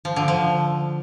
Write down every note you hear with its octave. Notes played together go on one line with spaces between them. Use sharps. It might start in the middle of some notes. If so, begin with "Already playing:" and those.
F3
D3
F3